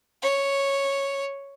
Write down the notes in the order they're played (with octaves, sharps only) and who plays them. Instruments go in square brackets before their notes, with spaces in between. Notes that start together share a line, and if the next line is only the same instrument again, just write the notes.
[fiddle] C#5